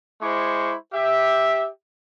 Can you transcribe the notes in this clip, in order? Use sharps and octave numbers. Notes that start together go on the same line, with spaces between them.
G#3 E4 C5 C#6 D6
G4 E5